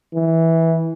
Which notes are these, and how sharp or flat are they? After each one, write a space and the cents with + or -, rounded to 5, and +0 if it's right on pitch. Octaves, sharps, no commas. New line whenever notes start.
E3 -10